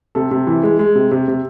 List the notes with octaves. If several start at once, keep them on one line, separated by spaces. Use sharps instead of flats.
C3 A4
C3
E3
G#3
G#3
C3
C3
C3